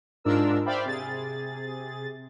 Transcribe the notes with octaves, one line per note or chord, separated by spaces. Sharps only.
G#2 D4 F4 A#4 E6
C5 D5 E5 F5 G5 B5
C3 G#4 A6